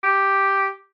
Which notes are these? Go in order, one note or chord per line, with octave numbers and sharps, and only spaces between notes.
G4